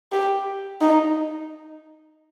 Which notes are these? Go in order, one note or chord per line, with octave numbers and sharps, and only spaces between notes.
G4
D#4